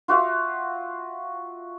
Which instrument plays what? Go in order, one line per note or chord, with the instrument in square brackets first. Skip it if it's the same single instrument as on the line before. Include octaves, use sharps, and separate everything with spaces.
[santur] F4 F#4 E5 F5